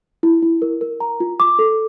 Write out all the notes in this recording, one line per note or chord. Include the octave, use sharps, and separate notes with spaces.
E4
E4
A#4
A#4
A#5
F4
D6
A4